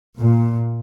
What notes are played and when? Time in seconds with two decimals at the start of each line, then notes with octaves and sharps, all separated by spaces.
0.17 A#2